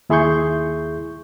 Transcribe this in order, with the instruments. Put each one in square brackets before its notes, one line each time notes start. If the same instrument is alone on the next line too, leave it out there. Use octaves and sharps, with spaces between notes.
[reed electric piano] D#2 E4 G#4 C6 C#6 G6